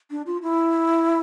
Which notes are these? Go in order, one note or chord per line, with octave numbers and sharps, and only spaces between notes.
D4
F4
E4